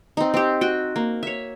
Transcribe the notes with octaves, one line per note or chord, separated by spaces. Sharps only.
C4 D#4
C4 G4
F#4 G5
A#3
C#5 E5